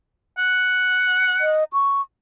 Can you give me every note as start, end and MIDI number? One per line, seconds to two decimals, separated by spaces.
0.38 1.55 78
1.41 1.64 75
1.73 2.01 85